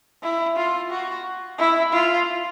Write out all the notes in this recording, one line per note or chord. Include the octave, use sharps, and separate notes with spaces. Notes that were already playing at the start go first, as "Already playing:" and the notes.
E4
F4
F#4
E4
F4